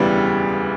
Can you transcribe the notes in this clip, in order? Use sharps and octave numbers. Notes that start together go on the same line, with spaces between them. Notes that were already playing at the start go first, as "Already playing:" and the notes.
Already playing: E1 D2 C#3 E3 G3 B3